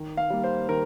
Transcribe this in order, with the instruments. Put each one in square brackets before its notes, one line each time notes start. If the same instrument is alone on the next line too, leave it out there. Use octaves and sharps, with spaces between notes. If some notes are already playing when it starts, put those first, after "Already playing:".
Already playing: [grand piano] D#3
F5
G3 A#3
C5
D#3 A#4